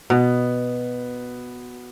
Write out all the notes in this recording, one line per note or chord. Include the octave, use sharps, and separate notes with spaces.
B2 B3